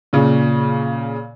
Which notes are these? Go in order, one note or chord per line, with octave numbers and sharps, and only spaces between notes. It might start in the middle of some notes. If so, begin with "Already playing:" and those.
A#2 C#3